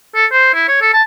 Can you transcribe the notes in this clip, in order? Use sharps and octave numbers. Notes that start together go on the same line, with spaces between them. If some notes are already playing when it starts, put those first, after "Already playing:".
A4
C5
E4
C#5
A4
A5